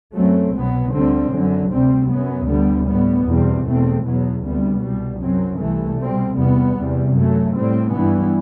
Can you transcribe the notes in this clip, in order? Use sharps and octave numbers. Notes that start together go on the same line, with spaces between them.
F#2 F#3 A3 C4
C2 B2 F#3 B3
D2 D3 G3 C4
F#2 D3 F#3
D2 C3 G3 C4
F#2 F#3 B3
D2 D3 G3 B3
A2 G3 B3
E2 B2 G3 C4
E2 B2 A3 C4
E2 B2 F#3 B3
D2 C3 G3 B3
C2 B2 G3
F#2 F#3 C4
C2 C3 E3 A3
B2 G3 C4
E2 C3 G3 B3
E2 C3 G3
F#2 F#3 A3
A2 G3 C4
G2 E3 G3 B3